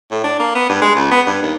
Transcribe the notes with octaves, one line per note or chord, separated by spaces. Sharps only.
A2
D4
A#3
B3
G2
G#3
C#2
B3
G2
D#2